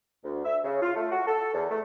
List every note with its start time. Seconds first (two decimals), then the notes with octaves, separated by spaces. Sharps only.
0.24 D2
0.45 E5
0.64 C#3
0.82 F4
0.96 A3
1.11 F#4
1.27 A4
1.54 E2
1.70 A3